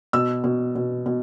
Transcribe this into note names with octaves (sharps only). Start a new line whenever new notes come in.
B2 E6
B2
B2
B2